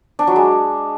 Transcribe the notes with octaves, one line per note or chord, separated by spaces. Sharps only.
D4
F#3
G#3